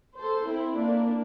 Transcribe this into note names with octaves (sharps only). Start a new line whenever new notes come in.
A4 C5
C4 E4
A#3 D4